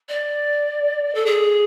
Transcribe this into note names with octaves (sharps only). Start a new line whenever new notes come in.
D5
A4
G#4